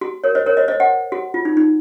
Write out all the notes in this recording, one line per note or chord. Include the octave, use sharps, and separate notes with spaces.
F#4
A#4 C#5
C5 D#5
A#4 C#5
C5 D#5
C5 D#5
D#5 F#5
F#4
F4
D#4
D#4